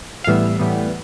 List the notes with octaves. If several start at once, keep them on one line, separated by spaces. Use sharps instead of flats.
F5
A2 E3 G3 B3 E5
A2 E3 G3 B3